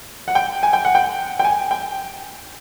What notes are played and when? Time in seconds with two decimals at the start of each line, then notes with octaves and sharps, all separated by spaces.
0.28 F#5
0.35 G5
0.63 G#5
0.73 G5
0.85 F#5
0.95 G5
1.39 G5
1.45 G#5
1.71 G5